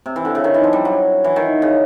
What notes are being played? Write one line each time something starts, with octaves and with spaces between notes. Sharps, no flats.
C3
E3
D3
C#3
D#3
E3
F3
G3
F#3
E3
D#3
C#3